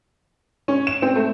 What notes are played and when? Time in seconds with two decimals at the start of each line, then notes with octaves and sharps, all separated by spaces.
0.68 C#4
0.87 E7
1.02 C4
1.16 A3